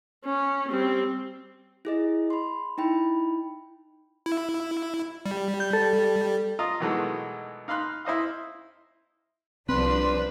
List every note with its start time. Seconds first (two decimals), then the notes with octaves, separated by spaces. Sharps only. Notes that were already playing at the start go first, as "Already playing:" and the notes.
0.25 C#4
0.71 G3 C4
1.85 E4 G#4 D#5
2.30 B5 C6
2.78 D#4 E4 G5 B5
4.26 E4
5.26 G3
5.60 G6
5.73 A4
6.59 F4 D#5 A#5
6.80 B2 D#3 E3 F#3 G#3 A3
7.68 D#4 F5 B5 C6 F#6
8.05 E4 C5 D#5 F5
9.69 C2 F3 C4 D4 B4 C6